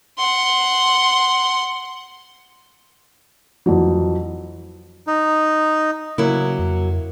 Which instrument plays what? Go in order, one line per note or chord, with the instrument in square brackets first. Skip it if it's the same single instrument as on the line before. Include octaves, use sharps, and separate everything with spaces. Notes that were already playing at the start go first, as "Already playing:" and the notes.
[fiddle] F#5 C6
[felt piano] F2 E3 F#3
[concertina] D#4
[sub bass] C#3 [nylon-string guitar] F#3 A#3 E4
[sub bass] F2